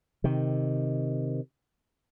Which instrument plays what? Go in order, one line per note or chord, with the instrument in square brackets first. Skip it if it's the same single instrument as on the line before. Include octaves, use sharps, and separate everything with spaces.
[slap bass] C3 D#3